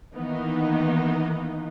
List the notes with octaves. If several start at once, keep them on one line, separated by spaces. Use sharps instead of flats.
D#3 E3 A#3 B3 D#4